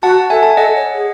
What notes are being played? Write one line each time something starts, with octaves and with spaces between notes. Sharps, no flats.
F#4 F#5 A5
A4 E5 G#5
A5
G#5
A4 D#5 F#5
C#5
G#4